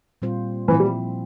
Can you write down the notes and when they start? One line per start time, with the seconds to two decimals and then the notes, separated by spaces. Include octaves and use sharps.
0.22 A#2 G3 C4 F4 C5
0.68 A#2 E3 F3 C4 E4
0.80 G3